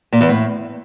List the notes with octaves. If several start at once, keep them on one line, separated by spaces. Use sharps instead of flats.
A#2
E2
A2